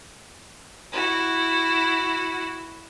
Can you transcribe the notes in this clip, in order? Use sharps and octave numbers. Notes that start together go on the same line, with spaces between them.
E4 F#4